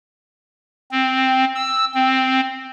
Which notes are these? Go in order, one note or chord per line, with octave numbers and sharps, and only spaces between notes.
C4
E6
C4